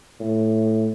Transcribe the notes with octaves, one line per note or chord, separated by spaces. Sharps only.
A2